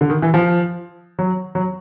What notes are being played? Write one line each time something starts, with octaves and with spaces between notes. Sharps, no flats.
D3
D#3
E3
F3
F#3
F#3